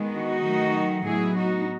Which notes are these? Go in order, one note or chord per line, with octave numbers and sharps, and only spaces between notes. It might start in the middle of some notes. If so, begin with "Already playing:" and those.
Already playing: D#3 G#3 B3
D#4 F#4
D#3 F#3 A3
A2 F#3 B3 E4 G#4
D#4 F#4